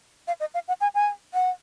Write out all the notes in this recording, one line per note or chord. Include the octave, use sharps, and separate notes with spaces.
F5
D#5
F5
F#5
G#5
G#5
F#5